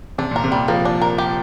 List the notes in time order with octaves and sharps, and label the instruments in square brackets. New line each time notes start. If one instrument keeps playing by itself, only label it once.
[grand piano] C3 [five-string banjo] D4
[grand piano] A#2
[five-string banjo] A#4
[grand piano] C3
[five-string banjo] G3
[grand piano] F3 [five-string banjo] A#3
[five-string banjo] D4
A#4
G4